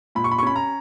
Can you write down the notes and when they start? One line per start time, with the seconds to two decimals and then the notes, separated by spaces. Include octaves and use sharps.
0.15 A#2 B5
0.24 C#6
0.31 B5
0.38 C#6
0.43 C#4 B5
0.56 A#5